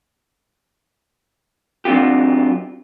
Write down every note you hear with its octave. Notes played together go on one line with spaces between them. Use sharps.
F#3 C4 D4 F4 G4